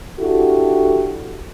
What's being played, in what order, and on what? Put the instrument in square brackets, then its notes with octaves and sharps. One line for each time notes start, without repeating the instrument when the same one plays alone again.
[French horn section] D4 E4 F#4 G4 A4